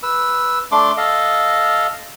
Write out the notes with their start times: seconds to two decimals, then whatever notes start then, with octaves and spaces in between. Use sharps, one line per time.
0.03 B4 E6
0.72 A3 D4 C6 D6
0.97 A4 D#5 F5